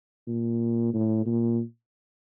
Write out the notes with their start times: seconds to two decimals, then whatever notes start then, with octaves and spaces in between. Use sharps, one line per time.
0.27 A#2
0.94 A2
1.26 A#2